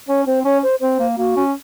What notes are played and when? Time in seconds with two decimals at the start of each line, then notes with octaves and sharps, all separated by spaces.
0.08 C#4 C#5
0.27 C4 C5
0.45 C#4 C#5
0.63 C5
0.81 C4 C5
0.99 A#3
1.17 A#3 F#4
1.36 C#4